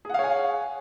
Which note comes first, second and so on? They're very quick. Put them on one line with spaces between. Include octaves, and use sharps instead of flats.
G#4 F#5 F5 C#5 G#5